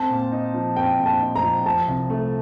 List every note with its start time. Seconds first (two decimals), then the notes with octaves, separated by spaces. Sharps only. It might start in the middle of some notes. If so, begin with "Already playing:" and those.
Already playing: C4 A5
0.10 A#2
0.32 D#4
0.54 F3
0.76 C4 G5
0.99 A#2
1.06 A5
1.21 D#4
1.35 A#5
1.43 F3
1.66 F3 A5
1.87 C2
2.10 A3